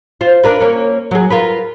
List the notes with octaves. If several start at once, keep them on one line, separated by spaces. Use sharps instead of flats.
F4 C5
D4 A#4 B4
A#3 C#4
F#3 G#4
F4 A#4 B4